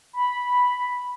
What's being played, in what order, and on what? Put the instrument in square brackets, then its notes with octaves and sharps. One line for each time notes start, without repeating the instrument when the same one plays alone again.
[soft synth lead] B5